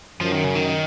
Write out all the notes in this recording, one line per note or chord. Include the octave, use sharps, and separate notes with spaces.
F#2 F3
D#3
C#3
D#3